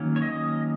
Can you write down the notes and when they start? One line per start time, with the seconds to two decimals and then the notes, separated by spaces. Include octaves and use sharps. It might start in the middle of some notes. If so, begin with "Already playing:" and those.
Already playing: D#3 F#3 A#3 C#4
0.16 C#5
0.22 D#5